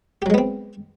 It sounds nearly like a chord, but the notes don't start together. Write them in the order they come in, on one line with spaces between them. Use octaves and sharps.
G4 F#3 G#3 B3 C4